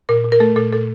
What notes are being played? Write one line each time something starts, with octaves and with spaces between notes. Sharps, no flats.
A#2 A#4
A#2
A#4
A3 A4
A#2 A4
A#2 A4